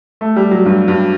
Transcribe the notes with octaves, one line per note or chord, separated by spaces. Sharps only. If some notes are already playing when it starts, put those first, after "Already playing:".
A3
G3
F#3
G2
G2